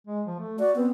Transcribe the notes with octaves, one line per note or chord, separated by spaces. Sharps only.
G#3
F3
A3
F#4 D5
B3 C4